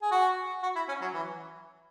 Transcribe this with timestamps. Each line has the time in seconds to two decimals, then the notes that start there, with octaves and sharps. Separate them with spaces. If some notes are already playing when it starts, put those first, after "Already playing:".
0.02 G#4
0.11 F#4
0.63 F#4
0.76 E4
0.88 C#4
1.01 F#3
1.14 E3